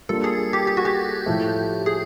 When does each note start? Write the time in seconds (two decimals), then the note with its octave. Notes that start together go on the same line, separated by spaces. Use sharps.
0.09 G3 A#3 D4 F4 A4
0.24 G#4
0.53 G4
0.67 G4
0.77 F#4
0.85 G4
1.26 A2 F3 A3
1.86 G#4